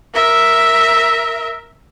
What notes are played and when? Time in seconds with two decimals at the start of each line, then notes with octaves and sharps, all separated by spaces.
0.14 A#4 E5